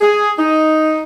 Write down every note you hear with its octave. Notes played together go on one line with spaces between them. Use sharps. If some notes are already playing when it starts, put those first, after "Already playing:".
G#4
D#4